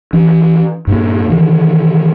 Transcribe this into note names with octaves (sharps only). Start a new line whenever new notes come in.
E3 C#4
G2 A#2 A#3
C3 D#3 E3